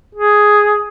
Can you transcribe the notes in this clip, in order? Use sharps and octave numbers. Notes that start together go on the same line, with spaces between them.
G#4